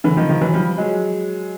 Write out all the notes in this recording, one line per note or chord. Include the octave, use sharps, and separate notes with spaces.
D3 E3
D#3 F3
D#3 F3
E3 F#3
F3 G3
F#3 G#3